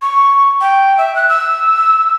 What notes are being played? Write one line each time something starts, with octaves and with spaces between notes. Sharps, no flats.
C#6
G5
E5
F#6
E6